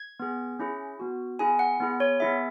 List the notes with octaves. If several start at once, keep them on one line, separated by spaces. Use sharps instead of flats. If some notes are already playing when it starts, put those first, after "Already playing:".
Already playing: G#6
B3 G#4
C#4 E4 G#4
B3 F#4
B3 E4 G#4 G#5
F#5
B3 E4 G#4
C#5
B3 E4 G#4 E5